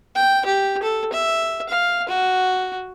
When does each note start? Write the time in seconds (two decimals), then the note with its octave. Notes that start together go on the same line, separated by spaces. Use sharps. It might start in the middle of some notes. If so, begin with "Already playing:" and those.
0.15 G5
0.45 G4
0.83 A4
1.13 E5
1.69 F5
2.09 F#4